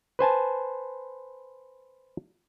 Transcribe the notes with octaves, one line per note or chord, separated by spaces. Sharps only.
B4 C5 G#5 A5